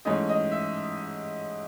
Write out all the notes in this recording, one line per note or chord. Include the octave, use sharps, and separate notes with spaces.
G#2 E3 A3 C#4 D#5
D#5
E5